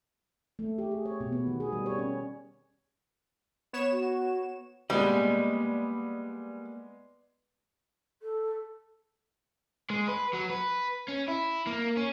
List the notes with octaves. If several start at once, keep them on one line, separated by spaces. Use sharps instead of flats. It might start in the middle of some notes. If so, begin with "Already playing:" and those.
A3
G4
G#4
C#5
B2
B3
D#3
G#4
G3
C#5
C#4
B3 C#5 E7
F#4
G3 G#3 A#3 B3 B4 D5 D#5
A4
G#3
B4
F#3
B4
C#4
E4
A#3
C#4